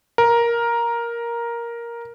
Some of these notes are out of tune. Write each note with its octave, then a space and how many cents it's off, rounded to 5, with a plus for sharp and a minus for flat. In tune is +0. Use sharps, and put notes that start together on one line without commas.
A#4 +10